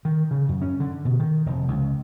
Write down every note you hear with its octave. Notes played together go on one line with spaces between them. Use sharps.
D#3
C#3
F#2
C#4
D3
B2
D#3
F1
C#2